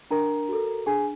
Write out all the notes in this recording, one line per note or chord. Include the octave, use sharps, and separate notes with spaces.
D4 A#4 A#5
F#4 A4
D4 G#4 G#5